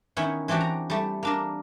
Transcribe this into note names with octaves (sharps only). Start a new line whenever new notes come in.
D#3 B3 C#4 E4
E3 C4 D4 F#4 G4
A#5
G3 A3
A#3 D4 A#4